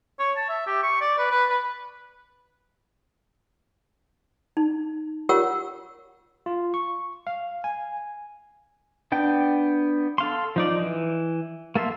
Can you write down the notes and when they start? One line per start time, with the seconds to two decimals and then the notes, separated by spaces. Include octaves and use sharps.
0.19 C#5
0.37 A5
0.49 E5
0.67 G4
0.83 C#6
1.01 D5
1.18 B4
1.31 B4
1.49 B4
4.57 D#4
5.29 F4 G4 A#4 C#5 F#5 E6
6.46 F4
6.74 C#6
7.27 F5
7.64 G#5
9.12 B3 D4 G5
10.18 A4 F5 C6
10.56 F3 D#4 D5
10.80 E3
11.76 A#3 A4 E5 C6